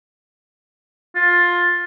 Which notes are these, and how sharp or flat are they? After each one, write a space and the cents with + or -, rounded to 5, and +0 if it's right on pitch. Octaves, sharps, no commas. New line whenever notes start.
F4 +15